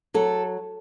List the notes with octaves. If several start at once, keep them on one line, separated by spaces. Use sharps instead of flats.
F#3 A4